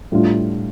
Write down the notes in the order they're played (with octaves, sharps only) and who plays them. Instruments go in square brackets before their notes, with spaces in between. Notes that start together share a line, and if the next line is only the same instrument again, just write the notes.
[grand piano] A2 G3 D4 F4